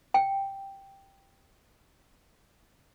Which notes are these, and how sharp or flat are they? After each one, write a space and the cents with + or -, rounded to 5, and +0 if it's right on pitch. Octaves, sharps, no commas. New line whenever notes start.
G5 +0